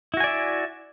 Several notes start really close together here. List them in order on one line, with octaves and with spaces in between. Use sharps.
E4 F#4 G#5 D5 E5